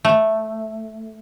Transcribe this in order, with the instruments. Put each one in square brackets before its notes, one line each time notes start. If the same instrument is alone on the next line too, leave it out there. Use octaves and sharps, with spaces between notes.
[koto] A3